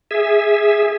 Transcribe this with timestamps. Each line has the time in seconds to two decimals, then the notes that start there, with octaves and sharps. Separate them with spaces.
0.11 G#4 E5